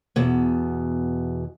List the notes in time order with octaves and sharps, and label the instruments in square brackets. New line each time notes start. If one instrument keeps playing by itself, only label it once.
[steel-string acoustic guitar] E2 B2